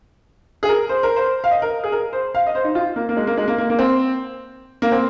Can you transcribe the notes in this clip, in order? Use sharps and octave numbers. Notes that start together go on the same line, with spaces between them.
G#4
A#4
C5
A#4
C5
F5
D#5
A#4
G#4
A#4
C5
F5
D#5
C5
D#4
F4
A#3
A#3
G#3
A#3
G#3
A#3
A#3
A#3
C4
A#3
C4